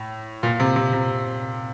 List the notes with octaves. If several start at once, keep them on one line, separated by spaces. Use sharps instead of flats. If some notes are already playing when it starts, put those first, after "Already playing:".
Already playing: A2
A#2
C3
C3
C3